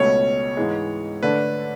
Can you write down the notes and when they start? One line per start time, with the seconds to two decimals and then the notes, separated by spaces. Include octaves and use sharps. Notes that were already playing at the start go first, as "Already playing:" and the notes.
Already playing: C#2 B2 A3 C#4 C#5
0.57 G#2 E3 G#3
1.23 D3 A3 D4 B4